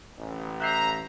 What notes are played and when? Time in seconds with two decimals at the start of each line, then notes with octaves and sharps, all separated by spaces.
0.18 A1
0.60 E5 A#5 F#6 G6 C7